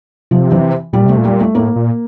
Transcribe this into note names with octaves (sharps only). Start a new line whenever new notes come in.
C3 F3
E3
A#2 G3
C3 A3
A#2
G3
A3
A2 A#3
A#2